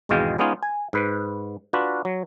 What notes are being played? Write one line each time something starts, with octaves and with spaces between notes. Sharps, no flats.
G#1 E2 B2 G#3 F5 G5
G#3 B3 C#4 D#4 F4 G#4
G#5
G#2 B4
D4 F4 F#4 B4
F#3